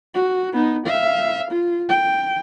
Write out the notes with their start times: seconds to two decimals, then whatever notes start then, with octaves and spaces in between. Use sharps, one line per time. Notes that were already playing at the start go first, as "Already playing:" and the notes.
0.14 F#4
0.53 B3 D#4
0.87 E5 F5
1.51 F4
1.89 G5